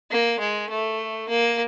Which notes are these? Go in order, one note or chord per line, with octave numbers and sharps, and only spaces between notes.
A#3
G#3
A3
A#3